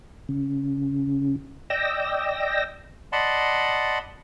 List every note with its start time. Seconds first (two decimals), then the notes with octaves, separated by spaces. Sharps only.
0.29 C#3
1.70 D5 D#5 G5 E6 A#6
3.12 D5 D#5 F#5 A5 B5 C6